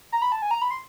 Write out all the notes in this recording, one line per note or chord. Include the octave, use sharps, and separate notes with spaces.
A#5
B5
A5
G#5
A#5
B5
C6